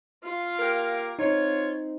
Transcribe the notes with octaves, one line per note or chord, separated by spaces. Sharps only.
F4 F5
A#3 G4 A#4
C4 D#4 F4 C#5